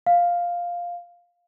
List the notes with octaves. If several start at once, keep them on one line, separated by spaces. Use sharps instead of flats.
F5